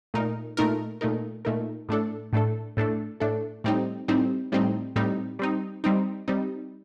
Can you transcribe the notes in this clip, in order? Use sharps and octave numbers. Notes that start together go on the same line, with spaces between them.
A#2 A3 D#4 A#4
A#2 A3 D#4 A#4
A#2 A3 D#4 A#4
A#2 A3 D#4 A#4
A2 A3 D4 A4
A2 A3 D4 A4
A2 A3 D4 A4
A2 A3 D4 A4
A2 G3 C4 D#4
A2 G3 C4 D#4
A2 G3 C4 D#4
A2 G3 C4 D#4
G3 C4 D#4
G3 C4 D#4
G3 C4 D#4